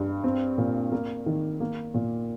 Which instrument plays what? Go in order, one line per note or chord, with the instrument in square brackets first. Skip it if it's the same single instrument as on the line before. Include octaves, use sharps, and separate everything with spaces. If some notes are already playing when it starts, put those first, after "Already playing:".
Already playing: [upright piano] G2
C4
A#2
A#3
D#3
A#3
A#2